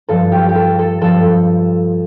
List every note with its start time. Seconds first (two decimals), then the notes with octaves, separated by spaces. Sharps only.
0.09 G2 F3 A4
0.32 G4
0.49 G4
0.55 A4
0.79 A4
1.01 G2 F3 A4